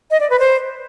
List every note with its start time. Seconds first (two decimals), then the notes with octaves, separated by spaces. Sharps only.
0.11 D#5
0.20 D5
0.30 B4
0.40 C5